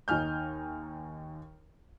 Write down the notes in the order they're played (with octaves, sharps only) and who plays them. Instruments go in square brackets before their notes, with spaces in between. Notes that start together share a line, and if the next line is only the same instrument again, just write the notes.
[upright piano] D#2 D#4 G#5 F6 G6